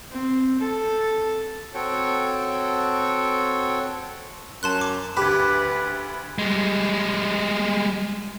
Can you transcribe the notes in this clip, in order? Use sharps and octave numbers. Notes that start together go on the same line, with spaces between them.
C4
A4
C4 F#4 A4 C#5 G5
F#2 A5 C6 F#6
D6
D2 G4 B4 B5 D6
G3 G#3